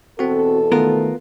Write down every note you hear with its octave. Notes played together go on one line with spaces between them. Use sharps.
E2 B2 C4 F#4 A4
D#3 A3 B3 F4 A#4